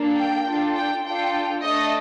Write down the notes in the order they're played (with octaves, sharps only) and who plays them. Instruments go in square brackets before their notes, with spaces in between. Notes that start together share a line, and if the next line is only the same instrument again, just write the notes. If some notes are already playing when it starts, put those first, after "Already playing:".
Already playing: [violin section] A#3 D4 A4
G5
D4 F4 A4
G5
D4 F4 A4 G5
A3 D4 A4 D#5